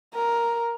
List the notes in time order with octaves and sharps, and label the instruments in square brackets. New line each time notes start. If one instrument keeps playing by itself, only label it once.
[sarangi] A#4